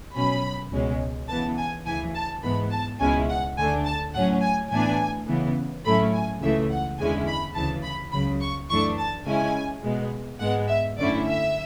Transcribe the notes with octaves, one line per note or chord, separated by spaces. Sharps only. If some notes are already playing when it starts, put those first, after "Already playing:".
B2 F#3 C#4 B5
C#2 B2 G#3 C#4
C#3 E3 B3 A5
G#5
D2 C#3 E3 G#5
A5
G#2 E3 G#3 B3 B5
A5
C#2 B2 G#3 C#4 E4 G#5
F#5
D2 D3 A3 D4 G#5
A5
A2 F#3 C#4 F#5
G#5
A2 E3 B3 D4 G#5
C#3 E3 B3
A2 F#3 A3 C#4 E4 B5
G#5
C#2 C#3 E3 A3 E5
F#5
E2 D3 G#3 C#4 E4 G#5
B5
D2 C#3 E3 A5
B5
C#2 C#3 F#3 B5
C#6
F#2 E3 A3 D4 C#6
A5
C#3 G#3 C#4 E4 G#5
B2 G#3 B3
G#2 G#3 B3 F#5
E5
F#2 D3 A3 C#4 E4 D5
E5